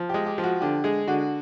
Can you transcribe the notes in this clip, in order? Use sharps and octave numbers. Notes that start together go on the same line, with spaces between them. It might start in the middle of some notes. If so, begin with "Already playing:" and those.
Already playing: F3
G#3 G4
G4
F3
F#4
D3 G4
G#3 G#4
D3 F#4